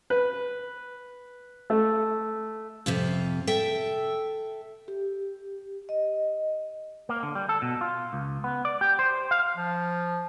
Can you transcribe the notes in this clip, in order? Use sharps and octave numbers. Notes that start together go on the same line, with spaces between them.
B4
A3
F2 C3 F4
A4 E5 G5
G4
D#5
A#3
D3
G3
A4
B2
F4
C#2
B3
D5
G4
C5
F5
F3